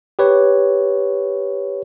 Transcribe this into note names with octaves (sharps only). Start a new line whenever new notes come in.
G4 B4 C#5